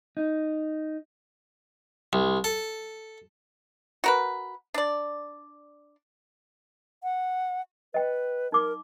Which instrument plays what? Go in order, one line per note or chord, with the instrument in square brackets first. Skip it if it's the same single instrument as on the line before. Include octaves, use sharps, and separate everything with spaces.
[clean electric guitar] D#4
[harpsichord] C2
A4
[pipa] F#4 A#4 B4
D4 D5
[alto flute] F#5
[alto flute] B4 [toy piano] D#5 G5
[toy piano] D#4 D6 [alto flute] A#4